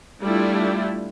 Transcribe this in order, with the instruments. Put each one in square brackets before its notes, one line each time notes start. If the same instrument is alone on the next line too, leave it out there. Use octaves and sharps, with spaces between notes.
[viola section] G3 A3 D4 E4 F4